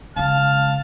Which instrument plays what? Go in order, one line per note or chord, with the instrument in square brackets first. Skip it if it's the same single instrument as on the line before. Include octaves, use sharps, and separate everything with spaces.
[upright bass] C#3 G#3 [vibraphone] F5 [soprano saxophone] A5 [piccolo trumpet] F6